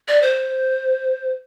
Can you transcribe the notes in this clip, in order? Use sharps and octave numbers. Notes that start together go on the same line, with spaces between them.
D5
C5